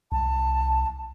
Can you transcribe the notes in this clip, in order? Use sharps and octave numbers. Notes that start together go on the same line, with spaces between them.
C2 A5